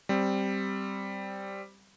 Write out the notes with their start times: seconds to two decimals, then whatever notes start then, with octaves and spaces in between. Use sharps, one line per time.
0.09 G3 C4